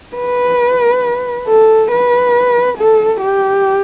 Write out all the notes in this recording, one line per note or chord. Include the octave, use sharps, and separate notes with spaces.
B4
A4
B4
A4
G4